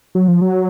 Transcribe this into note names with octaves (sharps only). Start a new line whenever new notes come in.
F#3
F3
F#3